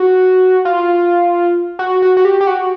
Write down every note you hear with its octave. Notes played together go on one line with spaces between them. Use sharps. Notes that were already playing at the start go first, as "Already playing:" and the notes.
Already playing: F#4
F4
F#4
F#4
F#4
G4
G4
F#4